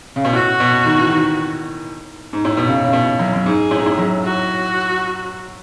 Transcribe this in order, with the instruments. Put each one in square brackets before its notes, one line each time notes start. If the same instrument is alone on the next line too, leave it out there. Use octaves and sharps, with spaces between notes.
[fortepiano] C#3
B2
[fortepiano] A2 [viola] F#4
[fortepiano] B2
D#3
E3
D#3
G#2
A2
B2
C#3
C#3
B2
F#2
F#2
[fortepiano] G#2 [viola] G#4
[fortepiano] A2
G#2
A2
F#2
[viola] F#4